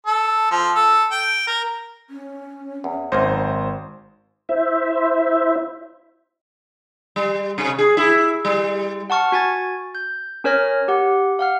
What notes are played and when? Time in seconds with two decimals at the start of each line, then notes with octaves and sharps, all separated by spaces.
0.06 A4
0.51 F3
0.75 A4
1.12 G5
1.47 A#4
2.10 C#4
2.84 E2
3.12 G#1 F#2 A#3 D#4 C5
4.49 E4 C5 E5
7.16 G3
7.58 C3
7.78 G#4
7.97 E4
8.45 G3
9.10 F#5 A5 C#6 F6
9.32 F#4 G#5 G#6 A6
9.95 G6
10.44 C#4 A#4 C#5 F6 A#6
10.88 G4 F#5
11.39 F5 F#5 F6